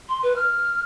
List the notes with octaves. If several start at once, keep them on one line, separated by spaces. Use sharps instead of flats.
C6
B4
F6